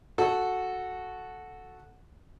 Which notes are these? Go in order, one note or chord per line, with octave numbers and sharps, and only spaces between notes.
F#4 A4